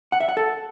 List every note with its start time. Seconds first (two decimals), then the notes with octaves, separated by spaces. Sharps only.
0.12 F#5
0.20 E5
0.29 F#5
0.37 A4